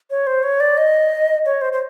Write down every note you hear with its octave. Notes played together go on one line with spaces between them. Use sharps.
C#5
C5
C#5
D5
D#5
C#5
C5
C5